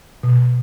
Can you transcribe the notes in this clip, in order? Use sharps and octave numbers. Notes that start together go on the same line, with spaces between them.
B2